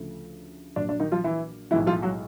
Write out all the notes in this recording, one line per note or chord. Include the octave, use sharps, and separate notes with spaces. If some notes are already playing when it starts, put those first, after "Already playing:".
Already playing: D2 C#3 F3 A3
A#1 A#2 F#3 D4
D4
D#3 D#4
F3 F4
E3 E4
B1 A2 E3 F3 G#3 E4
F3 F4
F#3 F#4